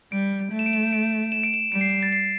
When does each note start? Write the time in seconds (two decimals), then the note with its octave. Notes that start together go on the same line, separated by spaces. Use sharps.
0.12 G3 D7
0.52 A3
0.59 E7
0.66 D7
0.73 E7
0.93 D7
1.32 E7
1.43 D7
1.54 E7
1.72 G3 D7
1.81 C7
1.90 D7
2.03 A6
2.12 C7